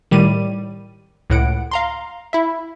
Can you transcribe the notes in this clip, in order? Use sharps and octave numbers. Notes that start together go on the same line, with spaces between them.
A2 D#3 G3 G4 D#7
C#2 A2 F#5 D7
F5 A#5 C6
E4 E5